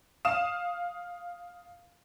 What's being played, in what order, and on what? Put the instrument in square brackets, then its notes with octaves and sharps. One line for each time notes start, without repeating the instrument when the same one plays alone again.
[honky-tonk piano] F5 D#6 E7